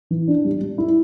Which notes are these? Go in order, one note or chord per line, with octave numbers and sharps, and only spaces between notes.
E3
D4
G3
G3
E4